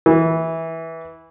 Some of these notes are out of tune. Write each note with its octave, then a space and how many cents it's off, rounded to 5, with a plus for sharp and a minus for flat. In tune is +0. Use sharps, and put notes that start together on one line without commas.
E3 -15